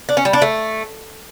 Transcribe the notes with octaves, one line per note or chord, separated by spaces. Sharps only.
D4
C#4
G3
D4
A3